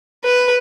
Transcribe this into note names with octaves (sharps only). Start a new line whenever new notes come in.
B4